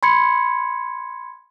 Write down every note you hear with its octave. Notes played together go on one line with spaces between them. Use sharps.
B5 C6 G#6 C#7